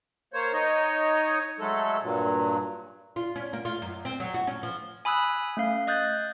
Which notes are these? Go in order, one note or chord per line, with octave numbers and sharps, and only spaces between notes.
A#3 C5 C#5
D#4 C#5 D#5
F#3 G#3 A3 A4
G2 A#2 F#3
F4
C#4
A#3
F4
F#2
C4
F#3
F#4
C#4
F3
G#5 B5 D#6 E6 F#6
A3 C#4 F5
D#5 D#6 F#6 G6 A6